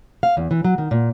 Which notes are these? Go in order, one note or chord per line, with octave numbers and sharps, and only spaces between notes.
F5
E2
E3
F#3
D#3
A#2